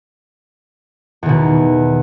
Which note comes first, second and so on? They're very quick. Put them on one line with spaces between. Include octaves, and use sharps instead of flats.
E2 D#3 B2